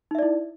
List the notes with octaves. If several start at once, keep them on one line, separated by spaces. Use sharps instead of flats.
D#4 E4 D5 E5